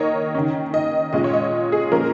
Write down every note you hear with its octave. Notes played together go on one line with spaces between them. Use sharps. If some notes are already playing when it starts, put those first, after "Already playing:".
Already playing: D#3 A#3 A#4 C#5 D#5
D#3 C#4
D#5
A#2 G#3 C#4 D#5
C#5
D#5
G#4
A#2 F3 A#3 C#4 A#4